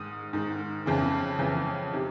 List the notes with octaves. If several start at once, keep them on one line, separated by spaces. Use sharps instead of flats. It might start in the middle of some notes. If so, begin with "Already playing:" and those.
Already playing: G#2 D#3 D#6
G#2 D#3
F2 C#3 E3
F2 C#3 E3
C3 D#3